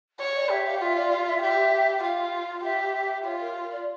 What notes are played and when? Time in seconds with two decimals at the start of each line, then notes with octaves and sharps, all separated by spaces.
0.20 C#5
0.36 D5
0.50 G4 E5
0.66 F5
0.81 F4 E5
0.97 D5
1.11 F5
1.27 E5
1.43 G4 E5
2.03 F4 F5
2.64 G4 E5
3.25 F4 C#5
3.41 A#4
3.72 D5